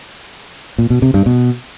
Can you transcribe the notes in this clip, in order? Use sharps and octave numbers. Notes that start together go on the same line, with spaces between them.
A#2
B2
C3
G2
B2